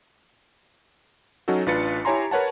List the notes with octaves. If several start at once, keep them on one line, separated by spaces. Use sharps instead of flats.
F#3 C#4 D#4 F#4 A4
A1 D4 F4 B4 A6 C#7
E4 G4 C#5 G#5 A#5 C6
A#4 B4 C#5 F#5 A5